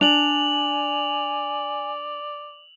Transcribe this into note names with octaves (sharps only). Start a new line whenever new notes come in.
D4 D5 G#5 F7 F#7